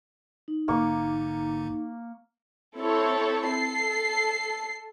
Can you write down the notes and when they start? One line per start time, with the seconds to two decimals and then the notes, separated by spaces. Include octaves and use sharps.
0.48 D#4
0.68 A1 G#2 D3 A#3 C#6
2.78 C4 E4 A4 C#5
3.49 A4 C7